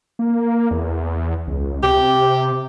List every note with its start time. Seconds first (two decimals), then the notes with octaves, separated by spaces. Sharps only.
0.19 A#3
0.71 E2
1.48 C#2
1.83 C3 G4